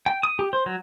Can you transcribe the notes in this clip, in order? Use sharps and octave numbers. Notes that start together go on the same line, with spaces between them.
G5
D#6
G4
C5
F#3